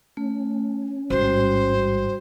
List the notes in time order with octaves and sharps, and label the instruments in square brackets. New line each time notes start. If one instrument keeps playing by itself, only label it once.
[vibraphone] A3 [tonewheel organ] C#4
[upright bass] A1 G#2 [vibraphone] G3 F#4 [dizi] C5